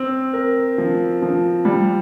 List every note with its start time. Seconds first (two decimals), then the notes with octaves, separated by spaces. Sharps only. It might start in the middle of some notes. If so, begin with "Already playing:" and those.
Already playing: C4
0.33 A#4
0.78 F3
1.22 F3
1.65 G3